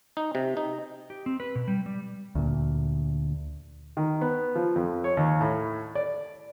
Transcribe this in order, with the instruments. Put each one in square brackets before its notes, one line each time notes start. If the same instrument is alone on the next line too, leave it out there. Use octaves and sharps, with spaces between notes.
[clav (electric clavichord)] D#4
C3
D#4
[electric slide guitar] G4
C4
B4
B2
G3
G3
[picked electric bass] D2 A#2
[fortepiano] D#3
B3
F3
F2
C#5
D#2
A2
D5